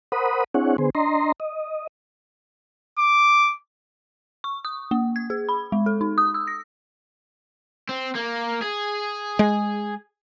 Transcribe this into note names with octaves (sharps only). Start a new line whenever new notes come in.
A#4 C5 F#5 B5 D#6
C4 D4 E4 G#4 C#5 F#5
D3 B3 G#4 C5
D4 D#5 A#5 C6
D#5
D6
C#6
D#6
A#3
G#6
G#4
B5
G#3
A4
D#4
D#6
E6
A#6
C4
A#3
G#4
G#3